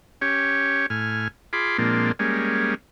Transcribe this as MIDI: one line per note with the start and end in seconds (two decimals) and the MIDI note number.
0.22 0.86 61
0.22 0.86 67
0.22 0.86 73
0.90 1.28 45
0.90 1.28 80
0.90 1.28 89
1.53 1.77 65
1.53 1.77 68
1.53 1.77 83
1.53 1.77 84
1.53 1.77 86
1.78 2.12 46
1.78 2.12 53
1.78 2.12 56
1.78 2.12 58
1.78 2.12 60
1.78 2.12 62
2.19 2.75 55
2.19 2.75 56
2.19 2.75 58
2.19 2.75 61